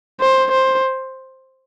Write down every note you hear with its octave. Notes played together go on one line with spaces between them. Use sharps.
C5
C5